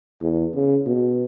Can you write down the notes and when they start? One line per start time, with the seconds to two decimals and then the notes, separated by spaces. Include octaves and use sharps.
0.22 E2
0.54 C#3
0.86 B2